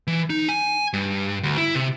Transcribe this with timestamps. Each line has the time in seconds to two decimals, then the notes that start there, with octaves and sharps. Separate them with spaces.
0.07 E3
0.30 D#4
0.49 G#5
0.93 G2
1.43 D2
1.57 E4
1.75 C3